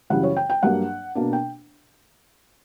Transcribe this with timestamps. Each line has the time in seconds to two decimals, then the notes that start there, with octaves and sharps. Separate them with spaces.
0.10 F#2 C#3 E3 G3 F#5
0.23 C#5
0.37 G5
0.50 G5
0.63 G2 F#3 A#3 D4 F#5
1.15 B2 A#3 D4
1.33 G5